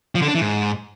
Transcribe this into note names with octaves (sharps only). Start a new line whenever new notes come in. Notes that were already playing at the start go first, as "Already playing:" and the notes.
F3
D3
D4
E3
G#2